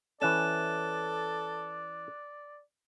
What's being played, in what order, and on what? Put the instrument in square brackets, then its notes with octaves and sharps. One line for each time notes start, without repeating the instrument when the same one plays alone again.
[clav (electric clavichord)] E3 C#4 [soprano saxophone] A4 [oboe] D5 [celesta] F#6 E7